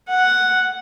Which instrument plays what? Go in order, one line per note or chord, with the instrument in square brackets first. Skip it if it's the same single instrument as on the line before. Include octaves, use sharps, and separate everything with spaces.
[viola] F#5